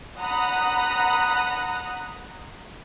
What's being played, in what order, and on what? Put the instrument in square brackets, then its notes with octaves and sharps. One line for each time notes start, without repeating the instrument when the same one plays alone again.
[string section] F#5 A#5 B5 D#6 F#6